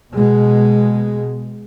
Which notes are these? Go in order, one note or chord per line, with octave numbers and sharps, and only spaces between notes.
B2 G#3